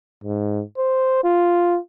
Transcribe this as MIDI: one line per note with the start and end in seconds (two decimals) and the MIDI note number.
0.24 0.63 44
0.78 1.20 72
1.24 1.78 65